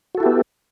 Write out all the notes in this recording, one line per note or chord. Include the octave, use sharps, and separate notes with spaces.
B3 E4 F#4 G4 A4